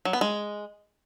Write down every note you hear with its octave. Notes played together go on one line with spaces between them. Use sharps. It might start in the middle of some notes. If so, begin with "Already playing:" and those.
F#3
B3
G#3